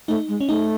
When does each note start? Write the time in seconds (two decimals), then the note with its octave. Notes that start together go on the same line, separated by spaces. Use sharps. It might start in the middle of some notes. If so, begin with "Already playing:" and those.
0.08 A3 D#4
0.28 G#3
0.41 C#4
0.48 A3 D#4